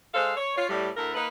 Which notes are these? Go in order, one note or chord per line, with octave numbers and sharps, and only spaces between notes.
G#3 A4 C5 F5
C#5
F4 C#5
A2 G3
D2 E4 A4 A#4
A#3 D#4 B4